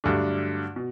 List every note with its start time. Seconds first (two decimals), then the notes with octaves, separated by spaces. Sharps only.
0.04 G2 D3 F#3 A3 D4
0.76 B2